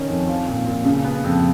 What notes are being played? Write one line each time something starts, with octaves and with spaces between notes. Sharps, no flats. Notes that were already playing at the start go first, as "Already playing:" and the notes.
Already playing: D#3 C#4
F2
F3
A#2
A#2
C#3
B3
F2